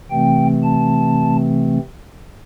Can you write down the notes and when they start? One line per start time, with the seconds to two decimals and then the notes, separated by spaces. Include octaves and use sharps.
0.10 C3 E3 A3 C4 G5
0.63 A5